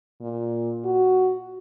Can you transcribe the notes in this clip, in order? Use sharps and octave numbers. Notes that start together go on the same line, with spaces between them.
A#2
F#4